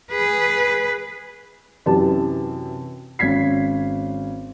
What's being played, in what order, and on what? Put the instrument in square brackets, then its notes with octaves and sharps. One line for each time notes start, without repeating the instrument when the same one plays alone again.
[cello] G#4 B4
[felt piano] F#2 C3 E3 G4 B4 A5
G#1 C#4 G#6 B6 C7